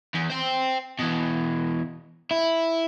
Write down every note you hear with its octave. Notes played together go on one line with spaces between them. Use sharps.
E2
C5 G5
B2 E3
E4